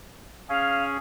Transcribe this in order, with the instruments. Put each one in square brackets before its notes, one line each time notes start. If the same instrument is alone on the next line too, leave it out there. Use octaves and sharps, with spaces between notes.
[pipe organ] C#4 G#4 [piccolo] F5